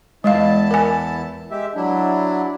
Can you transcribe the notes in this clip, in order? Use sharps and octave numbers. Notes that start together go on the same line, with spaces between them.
E2 G#3 E4 D#5 F5 A5
A#4 G#5
G#3 G4 E5
F#3 D4 E4